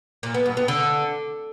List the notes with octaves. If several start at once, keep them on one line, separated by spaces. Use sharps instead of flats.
A#2
B3
G2
B3
D3